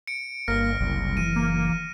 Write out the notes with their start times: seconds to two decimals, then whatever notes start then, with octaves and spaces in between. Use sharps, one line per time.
0.07 C#7 D7
0.48 G1 A#3 F6 A#6
0.80 F#1 C2
1.17 E3 D#7
1.36 A#3